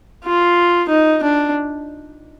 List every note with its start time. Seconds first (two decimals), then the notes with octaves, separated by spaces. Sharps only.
0.25 F4
0.89 D#4
1.22 D4